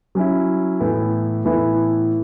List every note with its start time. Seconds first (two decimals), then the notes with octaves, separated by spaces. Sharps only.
0.15 F#3 C#4 E4
0.80 A2 E3 B3 E4
1.45 A2 E3 B3 E4